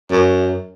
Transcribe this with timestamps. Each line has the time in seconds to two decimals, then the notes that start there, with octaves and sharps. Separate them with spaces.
0.11 F#2